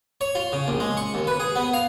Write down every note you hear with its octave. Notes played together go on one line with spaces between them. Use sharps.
C#5
F4
C#3
A#1
G#3
C#6
D#2
B4
G#4
B3
F5